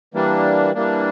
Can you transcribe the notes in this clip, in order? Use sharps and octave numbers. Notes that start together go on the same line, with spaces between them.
E3 G3 A#3 D4
E3 G3 A#3 D4